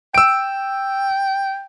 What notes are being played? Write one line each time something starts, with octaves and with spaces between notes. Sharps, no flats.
G5 E6 D7